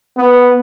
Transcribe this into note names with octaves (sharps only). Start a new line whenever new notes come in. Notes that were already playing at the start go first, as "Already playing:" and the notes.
B3